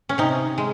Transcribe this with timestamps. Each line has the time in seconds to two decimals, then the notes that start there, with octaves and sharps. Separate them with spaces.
0.09 C#4
0.18 C3 D#4
0.58 G#3